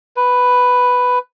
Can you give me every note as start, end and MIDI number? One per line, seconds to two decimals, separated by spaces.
0.17 1.19 71